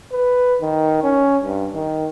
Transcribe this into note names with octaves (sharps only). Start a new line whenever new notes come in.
B4
D#3
C#4
G2
D#3